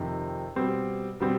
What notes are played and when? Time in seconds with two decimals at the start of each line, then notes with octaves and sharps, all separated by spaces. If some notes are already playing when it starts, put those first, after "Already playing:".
Already playing: F2 C3 D#3
0.56 B2 G3 C4
1.20 B2 G3 C4